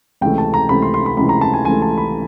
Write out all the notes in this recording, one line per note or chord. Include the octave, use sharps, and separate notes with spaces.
C#2 C3 E3 A3 G5
A5
A#5
C#2 C3 E3 A3 B5
C6
C6
B5
C#2 C3 E3 A3 B5
A#5
A5
G#5
C#2 C3 E3 A3 G#5
A5
B5